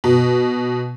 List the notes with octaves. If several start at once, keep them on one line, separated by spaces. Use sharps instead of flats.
B2